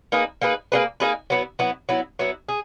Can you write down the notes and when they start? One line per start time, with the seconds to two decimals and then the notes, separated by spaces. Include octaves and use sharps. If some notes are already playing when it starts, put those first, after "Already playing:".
0.12 A#3 D#4 G#4 B4
0.41 A#3 D#4 G#4 B4
0.72 A#3 D#4 G#4 B4
1.00 A#3 D#4 G#4 B4
1.30 F#3 B3 E4
1.59 F#3 B3 E4
1.89 F#3 B3 E4
2.19 F#3 B3 E4
2.49 G#4